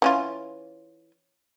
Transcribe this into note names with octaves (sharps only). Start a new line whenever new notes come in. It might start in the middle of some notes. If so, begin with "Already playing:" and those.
E3 C#4 F4